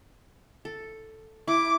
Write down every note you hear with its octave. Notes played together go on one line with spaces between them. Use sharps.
A4
E4 D6